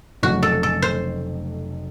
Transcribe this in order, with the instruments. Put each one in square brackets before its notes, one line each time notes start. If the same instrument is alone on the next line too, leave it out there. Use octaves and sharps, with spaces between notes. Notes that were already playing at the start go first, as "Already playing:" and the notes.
[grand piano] F1 F2 C#3 F#3 A3 [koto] F#4
[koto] A4
A4
C5